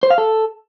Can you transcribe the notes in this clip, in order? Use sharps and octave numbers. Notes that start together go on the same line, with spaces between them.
C5
F5
A4